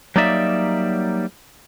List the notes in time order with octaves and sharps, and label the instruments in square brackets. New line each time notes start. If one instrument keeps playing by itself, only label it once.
[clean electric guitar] F#3 G3 A#3 D#4 D5 E5